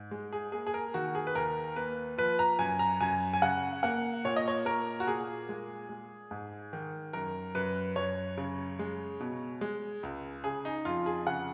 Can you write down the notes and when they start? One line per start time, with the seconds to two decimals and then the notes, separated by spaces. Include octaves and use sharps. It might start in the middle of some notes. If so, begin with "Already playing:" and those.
Already playing: G#2
0.11 G#3
0.33 G#4
0.52 A#3 G#4
0.67 G#4
0.74 A#4
0.94 D#3 F#4
1.15 G#4
1.27 B4
1.35 D#2 A#4
1.76 A#3 B4
2.18 F3 B4
2.39 A#5
2.59 F#2 G#5
2.79 A#5
3.00 F#2 G#5
3.33 G#5
3.42 C#3 F#5
3.83 A#3 F#5
4.24 A#2 C#5
4.36 D#5
4.48 C#5
4.65 A#3 A#4
5.00 F#4
5.07 A#2 G#4
5.49 G#3
5.89 G#3
6.31 G#2
6.73 D#3
7.13 F#2 A#4
7.55 F#2 B4
7.96 F#2 C#5
8.37 C#3
8.79 G#3
9.20 B2
9.61 G#3
10.03 C#2
10.44 C#3 G#4
10.65 D#4
10.85 F2 F4
11.06 G#4
11.26 C#3 F#5